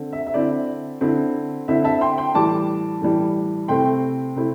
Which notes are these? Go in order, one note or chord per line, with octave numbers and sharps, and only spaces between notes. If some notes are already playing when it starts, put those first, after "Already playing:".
Already playing: D3 C4
E5
E5
D3 C4 E4 D5
D3 C4 E4
D3 C4 E4 E5
E5 A5
G5 C6
G5 C6
A2 E3 G3 A5 D6
A2 E3 G3
C3 A3 C4 E4 G5 C6
C3 A3 C4 E4